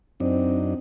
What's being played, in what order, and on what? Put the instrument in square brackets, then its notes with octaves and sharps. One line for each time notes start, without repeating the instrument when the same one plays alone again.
[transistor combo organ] F#2 D4 D#4 [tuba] C4